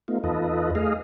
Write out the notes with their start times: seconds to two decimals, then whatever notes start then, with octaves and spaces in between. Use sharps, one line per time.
0.08 A3 B3 D#4 F4
0.24 E2 D#4 F4 A4 B4 D#5
0.75 A3 G#4 D#5 F5